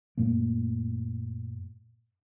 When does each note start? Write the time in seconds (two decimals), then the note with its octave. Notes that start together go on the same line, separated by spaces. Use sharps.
0.18 F#2 A#2 A3 A#3